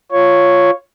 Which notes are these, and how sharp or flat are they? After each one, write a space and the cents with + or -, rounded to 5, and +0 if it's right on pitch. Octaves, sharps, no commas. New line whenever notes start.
F4 +0 C#5 +0